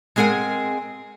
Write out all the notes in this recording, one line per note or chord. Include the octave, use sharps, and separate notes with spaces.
G#3 C4 G#4 A#4 F#5 G#5